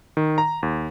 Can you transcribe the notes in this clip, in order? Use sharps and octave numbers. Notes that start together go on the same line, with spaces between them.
D#3
A#5
D#2